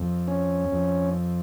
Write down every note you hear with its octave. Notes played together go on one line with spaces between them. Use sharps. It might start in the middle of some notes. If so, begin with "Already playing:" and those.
Already playing: F2
C#4
F2